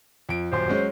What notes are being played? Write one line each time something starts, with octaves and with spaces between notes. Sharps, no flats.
F2 D7
D#1 F#2 C5 C6
F#3 G#3 C#4